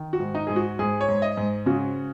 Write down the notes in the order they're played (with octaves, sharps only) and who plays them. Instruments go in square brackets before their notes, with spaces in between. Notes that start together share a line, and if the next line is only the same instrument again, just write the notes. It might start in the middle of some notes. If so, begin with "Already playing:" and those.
Already playing: [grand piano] D#3
F#4
G#2
D#4
G#2 G#4
F#4
G#2 G#4
C#5
G#2
D#5
G#2
C#3 F#4